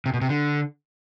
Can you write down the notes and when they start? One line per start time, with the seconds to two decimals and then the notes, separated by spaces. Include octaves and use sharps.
0.06 C3
0.14 B2
0.21 C3
0.29 D3